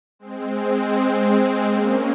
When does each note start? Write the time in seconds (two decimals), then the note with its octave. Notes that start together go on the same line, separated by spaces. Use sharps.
0.19 G#3 C4
1.67 A#3 C#4